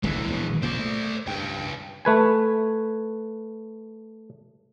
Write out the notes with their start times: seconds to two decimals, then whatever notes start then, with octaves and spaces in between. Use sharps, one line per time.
0.03 D#1 C#2 D3 E3 G#3
0.28 A#1 B2
0.63 A#2 C#3 C5 D5
0.79 A3
1.28 C#2 G2 G5
2.05 A3 B4 G#5